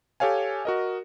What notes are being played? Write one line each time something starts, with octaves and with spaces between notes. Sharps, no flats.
G4 A4 C#5 F5 G#5
F#4 A#4 D#5